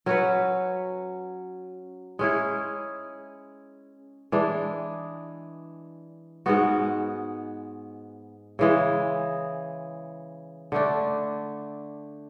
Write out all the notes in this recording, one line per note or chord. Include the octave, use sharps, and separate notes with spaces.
F#3 C#4 F#4 B4
G#3 C#4 E4 G#4
E3 G#3 D4
G#2 G#3 B3 F#4
C#3 E3 G#3
D3 A3 D4